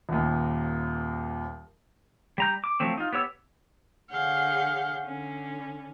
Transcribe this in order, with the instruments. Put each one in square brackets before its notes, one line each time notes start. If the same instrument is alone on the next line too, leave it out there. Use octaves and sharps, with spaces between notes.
[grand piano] D#1 D#2
[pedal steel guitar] G3 A#5 G6
D6
F3 F#3 A3 C4
D#4 F4
B3 G4 C#5 E6
[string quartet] D3 G#4 C#5 F5 F#5 G6
D3 C#4